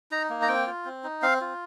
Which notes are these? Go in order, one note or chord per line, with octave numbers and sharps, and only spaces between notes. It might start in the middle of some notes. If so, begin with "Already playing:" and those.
D#4 A#5
A#3
A#5
C4 G5
F4
C4
D#4
C4 F5
F4